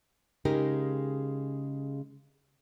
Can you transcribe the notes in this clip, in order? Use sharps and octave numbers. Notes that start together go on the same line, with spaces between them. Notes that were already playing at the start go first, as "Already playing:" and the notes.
C#3 G#3 D#4 G4 A#4